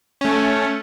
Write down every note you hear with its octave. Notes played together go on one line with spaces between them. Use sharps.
A3 C#4